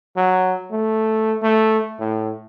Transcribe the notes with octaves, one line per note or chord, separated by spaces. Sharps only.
F#3
A3
A3
A2